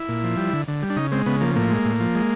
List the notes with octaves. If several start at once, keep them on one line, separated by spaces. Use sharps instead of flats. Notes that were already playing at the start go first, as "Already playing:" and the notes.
Already playing: E4
A#2
F3
G3
D3
D3
G3
D4
C#3 D#4
G#3 C4
C#3 B3
F3 A#3
A2 A#3
G#3
A2
F3
G#3